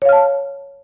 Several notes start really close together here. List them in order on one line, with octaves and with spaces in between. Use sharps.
C#5 F5 F6 A5